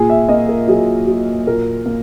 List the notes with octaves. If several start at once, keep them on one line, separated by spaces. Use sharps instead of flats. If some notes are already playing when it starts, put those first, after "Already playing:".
Already playing: A#2 G#4
E5
A#3 D#5
A#4
F#3 G#4
F#3
A#2 A#4
A#3